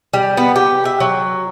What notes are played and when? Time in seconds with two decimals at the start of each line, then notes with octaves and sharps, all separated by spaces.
0.13 G3
0.37 B3
0.56 G4
0.85 E5
1.00 F#3